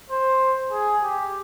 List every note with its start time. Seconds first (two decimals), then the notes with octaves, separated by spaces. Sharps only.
0.10 C5
0.72 G#4
1.03 G4